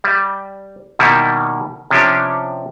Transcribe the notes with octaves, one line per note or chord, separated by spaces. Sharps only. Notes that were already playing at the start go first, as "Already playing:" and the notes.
G3
B2 D#3 G3 A#3 E4
C3 F3 C#4 D4 G4